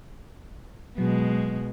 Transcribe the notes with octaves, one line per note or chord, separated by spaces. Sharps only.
B2 F#3 G#3